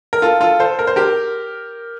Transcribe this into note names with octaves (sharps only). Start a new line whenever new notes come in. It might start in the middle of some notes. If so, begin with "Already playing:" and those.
A#4
F4 A4
F4 A4
A4 C5
A#4
C5
G4 A#4